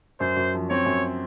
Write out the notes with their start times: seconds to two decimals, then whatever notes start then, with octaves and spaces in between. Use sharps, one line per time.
0.20 F#2 C5
0.36 F#2
0.54 F3
0.69 C4 C#5
0.86 F#2